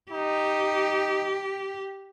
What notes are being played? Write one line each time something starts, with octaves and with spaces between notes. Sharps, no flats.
D#4 G4